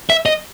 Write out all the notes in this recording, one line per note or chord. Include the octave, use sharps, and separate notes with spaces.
E5
D#5